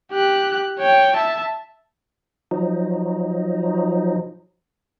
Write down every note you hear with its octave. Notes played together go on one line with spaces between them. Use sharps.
G4 F#6
C#5 G5
E5 A5
F3 F#3 D#4